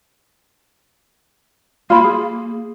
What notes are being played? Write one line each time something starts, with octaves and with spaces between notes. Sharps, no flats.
A#3 F4 B5
G#4